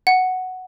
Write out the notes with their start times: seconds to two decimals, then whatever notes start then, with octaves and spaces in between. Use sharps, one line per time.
0.07 F#5